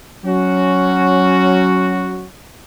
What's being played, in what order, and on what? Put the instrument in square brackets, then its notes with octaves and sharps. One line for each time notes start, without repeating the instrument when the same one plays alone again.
[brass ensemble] F#3 C#4 F#4